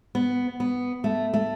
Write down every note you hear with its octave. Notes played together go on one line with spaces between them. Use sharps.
B3
B3
A3
A3